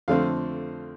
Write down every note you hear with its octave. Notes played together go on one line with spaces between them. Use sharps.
F2 D3 A3 C4 F5